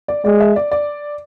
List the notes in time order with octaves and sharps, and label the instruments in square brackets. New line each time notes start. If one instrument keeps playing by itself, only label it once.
[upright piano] D5
[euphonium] G#3 [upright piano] D5
[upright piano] E5
D5
D5